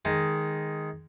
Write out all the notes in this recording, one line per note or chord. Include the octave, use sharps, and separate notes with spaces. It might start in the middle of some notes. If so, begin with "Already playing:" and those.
D#3 G#3